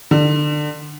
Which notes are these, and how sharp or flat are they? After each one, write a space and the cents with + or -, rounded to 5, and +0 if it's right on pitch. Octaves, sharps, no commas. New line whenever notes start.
D3 +25